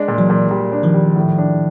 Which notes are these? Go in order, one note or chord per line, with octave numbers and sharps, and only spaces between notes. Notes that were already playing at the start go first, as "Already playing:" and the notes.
Already playing: G#3 D4
A#2
E3 F#3
A#2
G3
D4
D#3 F3
G3
A2
D4